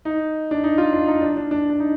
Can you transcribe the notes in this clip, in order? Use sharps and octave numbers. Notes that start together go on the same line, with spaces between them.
D#4
D4
D#4
F4
D4
D#4
D4
D4
D4
D4
D#4